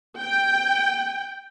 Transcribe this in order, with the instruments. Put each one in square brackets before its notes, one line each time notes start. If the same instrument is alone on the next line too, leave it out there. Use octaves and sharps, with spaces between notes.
[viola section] G5